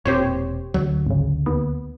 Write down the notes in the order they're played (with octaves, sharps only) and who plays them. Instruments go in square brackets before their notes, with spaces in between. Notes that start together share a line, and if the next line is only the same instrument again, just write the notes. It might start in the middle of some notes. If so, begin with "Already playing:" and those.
[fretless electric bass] E1 A#2 C4 [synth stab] G4 C5 C#5
[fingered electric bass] D2 [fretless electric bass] F#3
[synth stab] G#1 C#3
D#2 B3